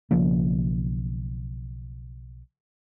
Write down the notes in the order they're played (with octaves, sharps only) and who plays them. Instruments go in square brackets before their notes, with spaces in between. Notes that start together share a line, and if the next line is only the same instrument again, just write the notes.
[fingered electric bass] B1 C#3 F3 A#3